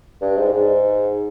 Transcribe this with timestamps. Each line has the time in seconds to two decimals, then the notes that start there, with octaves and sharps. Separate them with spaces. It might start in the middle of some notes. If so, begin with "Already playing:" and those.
0.22 G2
0.37 G#2
0.53 G#2